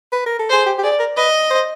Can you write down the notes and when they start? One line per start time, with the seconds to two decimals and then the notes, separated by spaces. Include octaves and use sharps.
0.12 B4
0.26 A#4
0.39 A4
0.50 G#4 C5
0.66 G4
0.78 G4
0.83 G#4 D5
0.99 A#4
1.17 B4 D#5
1.51 C5